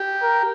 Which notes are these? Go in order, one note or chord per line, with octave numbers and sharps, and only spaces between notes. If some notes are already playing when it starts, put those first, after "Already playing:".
Already playing: G4
A#4